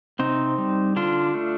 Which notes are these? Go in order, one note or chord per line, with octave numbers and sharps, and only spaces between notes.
C3 C4 D#4
G3
D3 D4 F4
A3